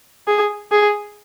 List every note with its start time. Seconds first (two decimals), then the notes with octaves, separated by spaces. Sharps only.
0.27 G#4
0.71 G#4